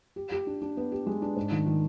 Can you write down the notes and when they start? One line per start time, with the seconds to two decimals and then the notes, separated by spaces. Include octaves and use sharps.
0.16 G4
0.32 G4
0.47 D4
0.62 D4
0.77 B3
0.92 G4
1.07 G#3
1.22 D4
1.36 G#2
1.51 D#3
1.66 D#3